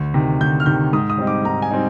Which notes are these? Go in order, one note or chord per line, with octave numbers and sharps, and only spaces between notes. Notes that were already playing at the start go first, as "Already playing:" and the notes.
Already playing: D2
C3 D#3
D2 G6
F6
C3 D#3 G6
G#2 D#6
D#6
G3 C4 D#4
D6
G#2 A#5
G#5
G3 C4 D#4